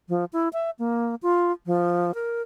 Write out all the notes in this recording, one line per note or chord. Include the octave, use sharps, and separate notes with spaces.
F3
E4
E5
A#3
F4
F3
A#4